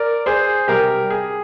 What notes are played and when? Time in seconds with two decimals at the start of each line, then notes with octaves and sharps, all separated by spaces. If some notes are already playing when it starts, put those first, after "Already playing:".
Already playing: A#4 D5
0.26 G#4 C5
0.68 C3 G3 G4 A#4
1.10 G#4